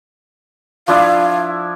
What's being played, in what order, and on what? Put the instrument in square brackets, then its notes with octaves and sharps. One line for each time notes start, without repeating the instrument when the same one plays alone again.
[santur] F3 D4 E4 [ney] F5